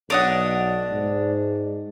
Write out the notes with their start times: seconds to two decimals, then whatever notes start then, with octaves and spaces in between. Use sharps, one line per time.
0.10 B1 D4 C#5 D#5 F#5
0.91 G#2